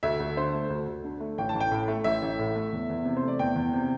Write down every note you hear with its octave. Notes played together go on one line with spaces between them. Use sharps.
D2 E5
D2
D3 C5
A3
D2
D2
D3
A3
A1 G5
A5
A1
G5
A2
A3
A1 E5
A1
A2
A3
E2
E2
C3
C5
A3 D5
E2 G5
E2
C3